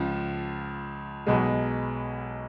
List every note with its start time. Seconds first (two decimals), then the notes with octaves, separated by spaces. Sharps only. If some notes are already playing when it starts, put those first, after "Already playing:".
Already playing: C#2 C#3 F3
1.26 B1 B2 G#3